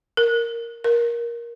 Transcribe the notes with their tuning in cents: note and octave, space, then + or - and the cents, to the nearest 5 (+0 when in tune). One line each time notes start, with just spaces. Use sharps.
A#4 -5
A#4 +15